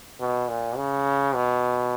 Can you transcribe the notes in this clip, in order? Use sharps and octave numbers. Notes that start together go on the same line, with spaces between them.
B2
A#2
C#3
B2